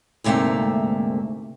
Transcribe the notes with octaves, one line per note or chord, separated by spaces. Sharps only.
D2 G#2 C3 A3 A#3 E5